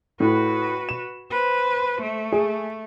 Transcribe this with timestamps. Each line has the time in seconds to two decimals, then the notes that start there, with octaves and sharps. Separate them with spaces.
0.20 A2 F#4 B4
0.89 E7
1.30 B4 C5
2.02 A3
2.32 G#4